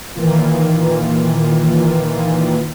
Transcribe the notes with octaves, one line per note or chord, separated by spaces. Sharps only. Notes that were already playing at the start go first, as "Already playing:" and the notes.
A#2 D#3 E3 A#3 F4